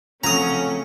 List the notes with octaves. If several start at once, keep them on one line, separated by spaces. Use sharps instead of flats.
C#3 F3 F#3 A3 C4 C#4 A#5 D#6